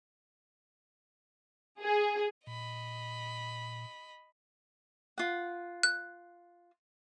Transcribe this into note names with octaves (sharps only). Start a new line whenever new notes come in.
G#4
A#2 D#5 B5
F4 F#5
F#6